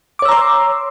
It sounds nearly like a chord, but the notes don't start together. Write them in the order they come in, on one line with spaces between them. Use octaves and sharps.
D6 C#5 E6 A#5 C6